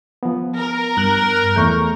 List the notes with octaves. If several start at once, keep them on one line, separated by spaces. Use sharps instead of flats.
F3 B3
A#4
G2 F#6
E2 A3 A#5 C#6 G6